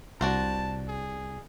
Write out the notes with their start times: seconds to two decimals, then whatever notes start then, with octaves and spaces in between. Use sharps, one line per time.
0.21 C2 D4 F#4 C5 A5
0.88 G#4